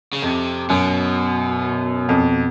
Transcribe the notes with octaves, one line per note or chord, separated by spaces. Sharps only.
C#3
F2 C3
F#2 B2
F2